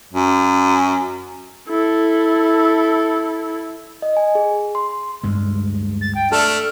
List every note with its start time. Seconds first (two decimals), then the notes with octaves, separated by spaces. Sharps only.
0.13 F#2
1.69 E4 A4
4.02 D#5
4.17 G#5
4.35 G#4
4.75 C6
5.24 D2 G2 G#3
6.01 A6
6.15 G5
6.32 A3 D4 A4 F6